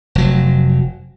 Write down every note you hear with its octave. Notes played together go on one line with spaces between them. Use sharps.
F1 F#3